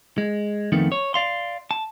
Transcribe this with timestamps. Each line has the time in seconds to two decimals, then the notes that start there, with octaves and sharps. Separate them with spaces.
0.18 G#3
0.72 F2 D#3 A3 B3
0.92 C#5
1.14 D5 F5 C6
1.71 A5